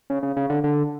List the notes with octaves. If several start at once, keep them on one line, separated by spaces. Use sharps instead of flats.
C#3
C#3
C#3
D3
D3